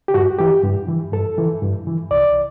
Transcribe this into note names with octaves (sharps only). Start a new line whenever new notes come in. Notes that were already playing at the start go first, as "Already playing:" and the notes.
G4
G2 F#4
E3 G4
G2
E3
G2 A4
E3
G2
E3
C2 D5